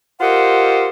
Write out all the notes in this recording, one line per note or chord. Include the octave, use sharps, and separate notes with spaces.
F4 G4 A#4 C5 D#5 F#5